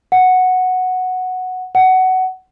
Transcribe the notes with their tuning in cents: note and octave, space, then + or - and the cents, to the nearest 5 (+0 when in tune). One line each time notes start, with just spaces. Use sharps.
F#5 -5
F#5 +15